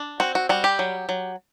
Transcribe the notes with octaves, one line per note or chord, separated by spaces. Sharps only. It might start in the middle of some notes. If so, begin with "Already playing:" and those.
Already playing: D4
C4 F#4
F#4
G3 F#4
G4
F#3
F#3